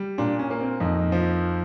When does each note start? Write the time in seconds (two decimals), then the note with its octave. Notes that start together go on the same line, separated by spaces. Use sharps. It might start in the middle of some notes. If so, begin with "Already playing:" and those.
Already playing: G3
0.18 A#2 D4
0.39 C#4
0.50 A#3
0.60 C4
0.80 F2 D#4
1.12 F3